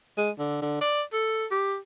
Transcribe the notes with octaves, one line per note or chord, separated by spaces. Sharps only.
G#3
D3
D3
D5
A4
G4